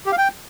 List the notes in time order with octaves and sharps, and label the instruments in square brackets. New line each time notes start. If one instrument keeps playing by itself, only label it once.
[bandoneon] G4
F5
G5